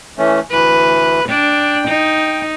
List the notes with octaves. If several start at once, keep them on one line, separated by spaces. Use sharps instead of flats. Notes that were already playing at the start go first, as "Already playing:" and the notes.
E3 A3 C#4
D2 E3 B4
D4 G5
D#4